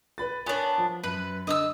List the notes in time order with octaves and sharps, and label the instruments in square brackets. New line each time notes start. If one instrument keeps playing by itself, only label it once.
[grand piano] B4 B5 A6
[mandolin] B3 D4 [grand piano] A#4 C#5 G#5
[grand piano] F3
[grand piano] F#2 [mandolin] B4
[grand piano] D3 [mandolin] D#5 D#6 E6